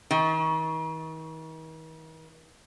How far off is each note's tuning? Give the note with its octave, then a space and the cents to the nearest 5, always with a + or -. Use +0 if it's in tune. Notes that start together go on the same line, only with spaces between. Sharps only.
D#3 +45